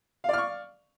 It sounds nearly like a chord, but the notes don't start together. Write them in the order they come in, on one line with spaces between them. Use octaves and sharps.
F5 D5 F6 C#6